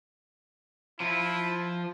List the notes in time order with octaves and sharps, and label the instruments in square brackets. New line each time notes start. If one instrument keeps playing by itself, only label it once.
[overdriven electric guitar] F3 [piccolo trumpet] E4